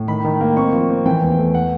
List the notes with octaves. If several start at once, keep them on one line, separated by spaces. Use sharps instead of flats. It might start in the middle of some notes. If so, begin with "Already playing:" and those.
Already playing: A2
D#3 B5
D#3
A#3
C4 C#6
F3
C4
E3 G5
E2
A3
F#5